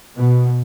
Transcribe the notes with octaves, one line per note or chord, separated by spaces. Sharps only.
B2